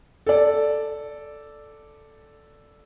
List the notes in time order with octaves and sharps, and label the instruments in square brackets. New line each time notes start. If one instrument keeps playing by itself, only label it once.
[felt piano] A4 D5